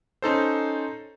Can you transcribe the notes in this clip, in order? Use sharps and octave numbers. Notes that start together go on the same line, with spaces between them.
C#4 D#4 A4 C5